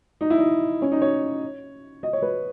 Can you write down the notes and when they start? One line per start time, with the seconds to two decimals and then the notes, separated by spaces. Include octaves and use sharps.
0.21 D#4
0.30 E4
0.38 D#4
0.82 C#4
0.92 D#4
1.02 C#5
2.03 D#5
2.13 C#5
2.22 B4